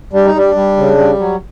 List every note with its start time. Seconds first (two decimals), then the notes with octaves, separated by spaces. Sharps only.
0.13 G3 D4
0.25 D#4
0.35 G3 D4
0.55 G3
0.77 C#3
0.98 G3
1.19 F#3